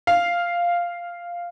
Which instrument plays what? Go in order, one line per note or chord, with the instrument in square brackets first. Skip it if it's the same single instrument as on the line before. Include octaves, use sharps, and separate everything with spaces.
[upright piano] F5